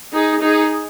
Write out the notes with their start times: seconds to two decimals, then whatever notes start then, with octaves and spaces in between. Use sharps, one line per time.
0.12 D#4 G#4
0.41 D#4 G#4